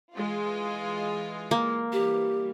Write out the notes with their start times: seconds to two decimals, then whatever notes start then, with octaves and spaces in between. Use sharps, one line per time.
0.14 E3 G#3 F4
1.51 A#3
1.92 E3 G3 G4